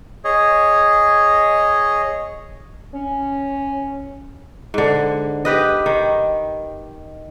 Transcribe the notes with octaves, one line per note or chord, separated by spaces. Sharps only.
G#4 C#5 D#5
C#4
G#2 D3
G4 B4 D#5
D#3